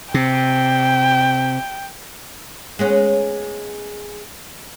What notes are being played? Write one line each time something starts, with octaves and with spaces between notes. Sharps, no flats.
C3 G5
G#3 B3 C#4